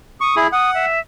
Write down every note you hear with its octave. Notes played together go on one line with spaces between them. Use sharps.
C#6 D#6
E4 G#4
F#5 D#6
E5